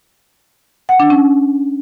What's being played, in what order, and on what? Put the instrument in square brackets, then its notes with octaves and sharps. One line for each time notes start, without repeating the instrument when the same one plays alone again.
[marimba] F#5
D4
C#4